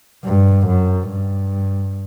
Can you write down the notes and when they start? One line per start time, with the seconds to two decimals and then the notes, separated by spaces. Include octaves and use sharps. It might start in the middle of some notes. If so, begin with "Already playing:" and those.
0.24 G2
0.67 F#2
1.08 G2